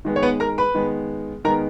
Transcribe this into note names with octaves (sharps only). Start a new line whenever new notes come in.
D#3 G#3 B3
C#5
B3 B4
A#4 A#5
B4 B5
D#3 G#3 B3
D#3 G#3 B3 A#4 A#5